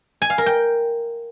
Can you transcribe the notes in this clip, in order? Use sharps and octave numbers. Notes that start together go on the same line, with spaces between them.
G#5
F5
A#4
G5